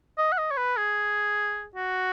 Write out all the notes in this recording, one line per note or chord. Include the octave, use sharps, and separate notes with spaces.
D#5
F#5
D#5
C#5
B4
G#4
F#4